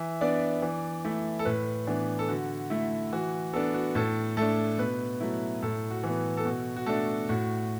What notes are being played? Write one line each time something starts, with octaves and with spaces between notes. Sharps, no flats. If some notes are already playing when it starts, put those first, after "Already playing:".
Already playing: E3 E5
B3 D4 D5
E3
A3 E4
A4
A2 B4
E3 B3 D4
A4
D3 F#4
A3 E4
E3 F#4
B3 D4 A4
F#4
A2 A4
A3 D4 A4
B2 B4
F#3 A3 E4
A2 A4
F#4
E3 B3
A4
B2 F#4
F#4
A3 D4 A4
A2 F#4